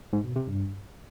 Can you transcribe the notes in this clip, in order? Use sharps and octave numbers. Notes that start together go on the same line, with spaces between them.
G#2
B2
C3
G2